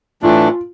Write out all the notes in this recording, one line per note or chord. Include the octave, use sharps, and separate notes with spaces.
A2 E3 A3 D4 F4